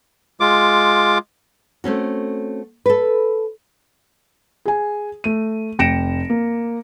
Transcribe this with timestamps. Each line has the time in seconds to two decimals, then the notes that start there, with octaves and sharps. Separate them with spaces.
0.40 G#3 F4 D6
1.84 A3 C4 C#4 F#4
2.86 A4 B4
4.65 G#4 G#5
5.24 A3 D#7
5.79 F1 G5 A#6 C#7 D7 E7
6.30 A#3